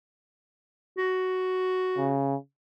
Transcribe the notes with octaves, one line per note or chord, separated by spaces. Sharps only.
F#4
C#3